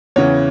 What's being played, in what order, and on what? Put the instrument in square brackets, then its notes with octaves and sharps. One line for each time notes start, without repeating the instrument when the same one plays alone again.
[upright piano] E2 C#3 E3 C#5